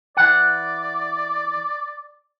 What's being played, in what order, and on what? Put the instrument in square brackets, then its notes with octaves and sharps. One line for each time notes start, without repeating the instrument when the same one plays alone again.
[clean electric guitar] E3 F#5 [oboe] D5